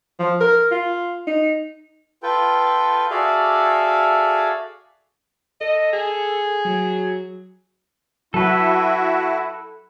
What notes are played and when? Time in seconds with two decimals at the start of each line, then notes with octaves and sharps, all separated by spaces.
0.19 F3
0.40 A#4
0.71 F4
1.27 D#4
2.23 F4 A4 B4 G5
3.10 F#4 G#4 A4 D5 E5 F5
5.61 A4 D#5
5.93 G#4
6.65 F#3
8.34 F#3 E4 F#4 A4 B4